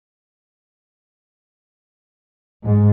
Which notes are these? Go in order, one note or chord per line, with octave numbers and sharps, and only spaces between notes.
G#2